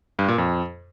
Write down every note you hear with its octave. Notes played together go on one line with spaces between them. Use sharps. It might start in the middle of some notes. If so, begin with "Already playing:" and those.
G2
A#2
F2